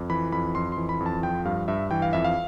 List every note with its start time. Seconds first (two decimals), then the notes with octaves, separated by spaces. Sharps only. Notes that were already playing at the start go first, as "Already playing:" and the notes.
Already playing: F2
0.10 E3 B5
0.32 F2 B5
0.55 F2 C6
0.72 E3 C6
0.89 B5
1.00 F2
1.06 A5
1.23 F3 G5
1.45 G2 F5
1.68 G2 E5
1.91 E3 G5
2.02 F5
2.13 F2 E5
2.24 F5